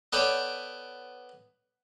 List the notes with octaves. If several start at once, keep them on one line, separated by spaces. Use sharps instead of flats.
B3 A4 B4 C#5 D5 G5